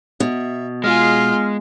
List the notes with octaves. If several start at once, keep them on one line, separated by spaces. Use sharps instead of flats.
B2 E5
G#3 F4 G#4 F6